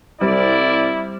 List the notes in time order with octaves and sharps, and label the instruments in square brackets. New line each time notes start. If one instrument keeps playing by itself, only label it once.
[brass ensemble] C2 D5 [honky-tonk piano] G3 C4 [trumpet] E4